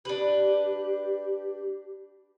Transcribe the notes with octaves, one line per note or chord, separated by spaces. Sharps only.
D4 G4 B4